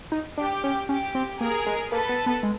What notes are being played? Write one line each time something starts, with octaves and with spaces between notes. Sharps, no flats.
D#4
D4 G4
C#4
C#4 G4
C4
A#3 G#4 A#4
G#3
A#3 A4 B4
B3
B3
G#3